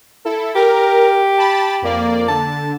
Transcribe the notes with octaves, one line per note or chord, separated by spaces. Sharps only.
E4 A4
G4 A#4
A5 B5 A6
F2 A#3 D5
D3 A5